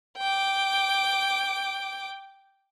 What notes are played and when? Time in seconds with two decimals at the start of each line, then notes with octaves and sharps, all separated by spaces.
0.18 G5 D6